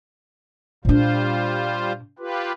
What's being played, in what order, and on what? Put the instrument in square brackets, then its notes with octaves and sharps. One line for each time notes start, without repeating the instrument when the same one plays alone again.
[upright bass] A#2 D4 [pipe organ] G3 F4 C5
[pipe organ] F4 G4 B4